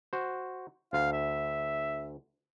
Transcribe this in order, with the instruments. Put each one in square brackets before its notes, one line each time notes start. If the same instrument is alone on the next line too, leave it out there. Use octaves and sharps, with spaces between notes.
[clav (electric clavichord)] F#4 C5
[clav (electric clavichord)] D2 [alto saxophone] F5
[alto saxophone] E5